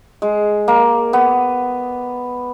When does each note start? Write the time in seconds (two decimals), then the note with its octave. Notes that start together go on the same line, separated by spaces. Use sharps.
0.22 G#3
0.68 A#3
1.13 B3